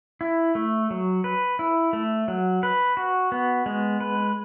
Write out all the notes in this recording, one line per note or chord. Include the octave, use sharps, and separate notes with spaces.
E4
A3
F#3
B4
E4
A3
F#3
B4
F#4
B3
G#3
B4